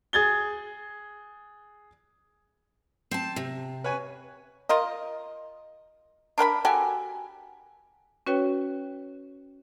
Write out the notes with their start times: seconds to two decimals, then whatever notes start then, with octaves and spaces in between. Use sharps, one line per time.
0.13 G#4 G#6 A6 G7
3.11 C4 A5
3.36 C3
3.84 B4 C#5 G#5
4.69 F4 A#4 D#5
6.38 D4 A#4 F#5 B5
6.65 F#4 G4 A4 G#5
8.27 C#4 F#4 B4 C#5 G5